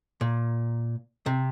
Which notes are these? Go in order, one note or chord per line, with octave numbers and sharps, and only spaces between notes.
A#2
C3